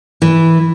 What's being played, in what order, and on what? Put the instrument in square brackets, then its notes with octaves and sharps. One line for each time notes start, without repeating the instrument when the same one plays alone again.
[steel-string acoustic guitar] E3